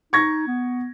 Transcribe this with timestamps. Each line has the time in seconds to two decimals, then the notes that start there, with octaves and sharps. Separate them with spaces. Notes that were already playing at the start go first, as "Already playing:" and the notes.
0.13 D#4 C#6 G#6 A#6
0.47 B3